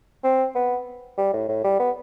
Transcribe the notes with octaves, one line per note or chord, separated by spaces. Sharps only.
C4
B3
G3
A2
A2
G3
B3